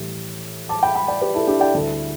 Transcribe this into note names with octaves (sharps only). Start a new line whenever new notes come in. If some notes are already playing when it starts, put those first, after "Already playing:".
Already playing: A2 E3 G3
A5 D6
G5 B5
G5 B5
D5 G5
G4 B4
E4 A4
D4 G4
D5 G5
D2 D3 G3 E4 A4